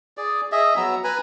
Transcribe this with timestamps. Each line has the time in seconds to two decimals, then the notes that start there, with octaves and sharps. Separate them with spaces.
0.17 G#4 D5
0.52 G#4 D#5 E5
0.77 F#3 B3 A#5 E6
1.04 B4 G#5 A#5 B5